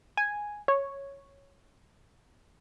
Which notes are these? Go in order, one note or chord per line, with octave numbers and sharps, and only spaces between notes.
G#5
C#5